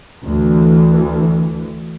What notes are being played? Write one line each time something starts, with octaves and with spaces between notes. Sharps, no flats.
D2 E3